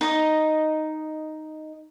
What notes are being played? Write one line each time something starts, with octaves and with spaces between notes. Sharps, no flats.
D#4 D#5